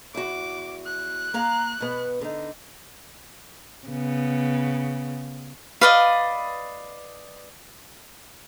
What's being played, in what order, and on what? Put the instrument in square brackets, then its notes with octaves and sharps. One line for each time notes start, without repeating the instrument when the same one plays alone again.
[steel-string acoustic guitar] E2 F#4 [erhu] D6
[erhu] F#6
[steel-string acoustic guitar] A#3 F5 A#5
B2 B3
D3 D#4
[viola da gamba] C#3 B3
[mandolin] B4 D5 D#5 [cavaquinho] F5